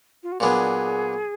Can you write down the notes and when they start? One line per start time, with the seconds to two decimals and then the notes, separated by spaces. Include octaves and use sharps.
0.23 F4
0.32 F#4
0.40 A#2 F#3 B3 D4 G#4